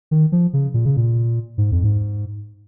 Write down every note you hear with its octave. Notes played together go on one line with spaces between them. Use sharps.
D#3
F3
C#3
A#2
C#3
A#2
G#2
F2
G#2